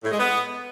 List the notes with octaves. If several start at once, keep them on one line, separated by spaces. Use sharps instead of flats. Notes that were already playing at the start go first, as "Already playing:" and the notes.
A2
G#3
B3